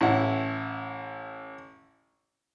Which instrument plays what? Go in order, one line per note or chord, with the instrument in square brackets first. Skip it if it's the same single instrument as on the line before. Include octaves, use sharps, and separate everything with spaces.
[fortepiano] A1 E4 F#5